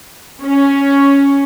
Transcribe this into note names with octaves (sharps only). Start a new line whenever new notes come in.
C#4